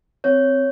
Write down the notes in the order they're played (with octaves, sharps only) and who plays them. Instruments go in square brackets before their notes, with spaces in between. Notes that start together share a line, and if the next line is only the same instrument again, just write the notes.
[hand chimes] C4 C#5